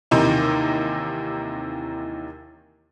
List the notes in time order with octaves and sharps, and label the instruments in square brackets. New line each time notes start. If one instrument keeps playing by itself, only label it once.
[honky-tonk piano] D#2 C3 E3 D#4